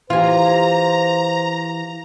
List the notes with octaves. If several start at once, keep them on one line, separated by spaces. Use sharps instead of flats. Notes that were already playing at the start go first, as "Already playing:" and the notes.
E3 F4 G4 C5 G#5 A#5